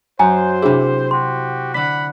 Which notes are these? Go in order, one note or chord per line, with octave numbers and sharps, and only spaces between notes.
F#2 C5 G#5 A#5
C3 D4 E4 G#4
F#4 G4 C6
D3 D4 F#5 B5 B6